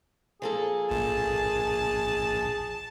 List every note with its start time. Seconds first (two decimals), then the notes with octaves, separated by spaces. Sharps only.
0.42 F3 A#3 G#4 A4
0.91 A#1 A5